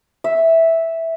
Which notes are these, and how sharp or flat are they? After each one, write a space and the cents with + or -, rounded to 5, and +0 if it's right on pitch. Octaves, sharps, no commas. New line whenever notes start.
E5 -5